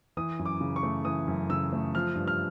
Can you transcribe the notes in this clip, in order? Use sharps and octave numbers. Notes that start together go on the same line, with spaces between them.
E3 D#6
F#2
D6
C#3
C#6
A3
E3 D#6
F#2
C#3 E6
A3
F3 F6
G2
F6